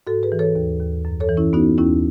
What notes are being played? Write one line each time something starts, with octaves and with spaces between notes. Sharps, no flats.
G#2 F#4 A4
G#4 B4
E3
A4 C#5
D#2
D#2
F#2
A4 C#5
E3
C#4 E4
B3 D#4 F#4
D#2 C#4 E4